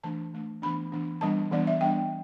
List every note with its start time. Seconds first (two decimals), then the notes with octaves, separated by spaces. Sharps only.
0.03 E3 A3 D4 A5
0.33 E3 A3 D4
0.62 E3 B3 D4 B5
0.92 E3 B3 D4
1.21 E3 G3 B3 D4 A5
1.51 E3 G3 B3 D4 D5
1.67 E5
1.81 G3 B3 D4 G5